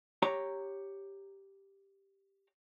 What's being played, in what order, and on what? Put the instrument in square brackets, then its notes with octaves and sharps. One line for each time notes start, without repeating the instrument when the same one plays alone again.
[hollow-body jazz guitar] G4 C#5 A#5